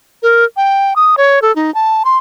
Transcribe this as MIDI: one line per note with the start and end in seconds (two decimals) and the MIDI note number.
0.23 0.44 70
0.57 0.94 79
0.96 1.15 87
1.17 1.42 73
1.42 1.54 69
1.56 1.73 63
1.74 2.03 81
2.05 2.18 84